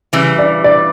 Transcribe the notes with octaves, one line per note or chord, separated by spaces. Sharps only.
C#3 E3 G3
D5
D5